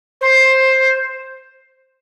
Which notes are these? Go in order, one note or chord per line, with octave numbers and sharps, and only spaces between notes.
C5